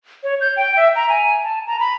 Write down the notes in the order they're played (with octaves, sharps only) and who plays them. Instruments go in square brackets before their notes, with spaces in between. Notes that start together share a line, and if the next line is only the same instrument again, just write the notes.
[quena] C#5
G6
G5
E5
A#5
G#5
A5
A#5
B5